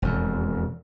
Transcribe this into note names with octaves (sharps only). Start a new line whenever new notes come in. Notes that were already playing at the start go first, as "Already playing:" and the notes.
E1 F2